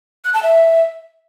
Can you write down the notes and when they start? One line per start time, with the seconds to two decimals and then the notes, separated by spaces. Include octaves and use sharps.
0.25 F#6
0.34 A5
0.43 E5